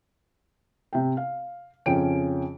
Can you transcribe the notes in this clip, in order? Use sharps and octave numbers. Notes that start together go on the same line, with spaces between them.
C3 G5
F5
F2 C#3 C#4 G5 D7